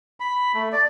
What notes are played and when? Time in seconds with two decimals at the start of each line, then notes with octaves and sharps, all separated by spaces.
0.20 B5
0.54 A3
0.72 D5